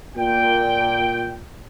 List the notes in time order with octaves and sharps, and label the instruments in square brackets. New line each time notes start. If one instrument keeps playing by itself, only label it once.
[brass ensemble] A#2 G5